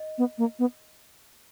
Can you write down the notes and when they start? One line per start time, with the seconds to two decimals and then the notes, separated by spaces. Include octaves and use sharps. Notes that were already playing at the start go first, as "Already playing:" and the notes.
Already playing: D#5
0.18 B3
0.38 A#3
0.59 B3